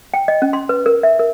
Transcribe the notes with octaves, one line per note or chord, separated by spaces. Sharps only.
G5
D#5
C#4
C6
B4
A#4
E5
A#4